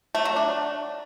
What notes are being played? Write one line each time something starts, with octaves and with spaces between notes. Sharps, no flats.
A3
F#3
D4